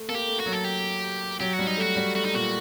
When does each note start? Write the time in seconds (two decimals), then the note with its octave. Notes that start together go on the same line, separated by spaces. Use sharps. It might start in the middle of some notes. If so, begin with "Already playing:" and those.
Already playing: A3
0.09 A#3 A4
0.14 G4
0.27 A3
0.40 F#4
0.46 F#3
0.53 A4
0.64 G4
1.40 F#3 G4
1.53 F#4
1.59 G3
1.67 D#4
1.77 A3 F#4
1.96 G3
2.15 A3 F#4
2.25 D#4
2.34 A#2 F#4